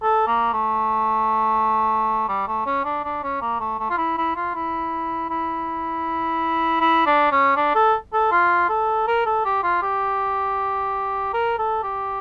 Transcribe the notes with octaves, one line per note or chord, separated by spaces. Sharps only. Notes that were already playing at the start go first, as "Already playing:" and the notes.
A4
A#3
A3
G3
A3
C#4
D4
D4
C#4
A#3
A3
A3
F4
E4
E4
F4
E4
E4
E4
D4
C#4
D4
A4
A4
F4
A4
A#4
A4
G4
F4
G4
A#4
A4
G4